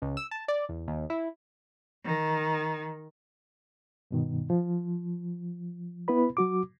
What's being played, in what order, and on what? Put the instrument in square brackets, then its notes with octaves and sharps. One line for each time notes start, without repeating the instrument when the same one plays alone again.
[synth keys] C#2
E6
A5
D5
E2
D#2
E4
[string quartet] D#3
[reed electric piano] G2 B2 D#3
F3
B3 E4 B4 B5
F#3 F#4 D6